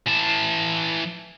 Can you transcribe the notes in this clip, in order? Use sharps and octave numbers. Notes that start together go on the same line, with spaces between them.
E3 A5